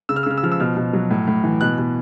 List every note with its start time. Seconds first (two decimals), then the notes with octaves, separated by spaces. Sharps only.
0.09 C#3 E6
0.16 F6
0.23 E6
0.26 C#3 F6
0.38 E6
0.43 F3 F6
0.52 E6
0.60 B2 F6
0.77 B2
0.93 F#3
1.11 A2
1.27 A2
1.44 E3
1.61 B2 F#6
1.78 B2